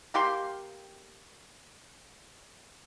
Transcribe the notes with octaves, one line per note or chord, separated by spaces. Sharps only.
A#3 G4 G5 C6